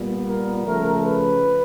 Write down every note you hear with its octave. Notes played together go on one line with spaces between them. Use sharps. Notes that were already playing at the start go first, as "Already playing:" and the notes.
Already playing: A#2 G3 B3
A#4
C#3 F3 A3 A#4
B4